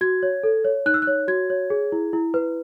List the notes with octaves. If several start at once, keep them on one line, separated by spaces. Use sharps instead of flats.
F#4 G#6
C#5
A4
C#5
D#4 F#6
E6
F#6
C#5
F#4 G#6
C#5
G#4
E4
E4
B4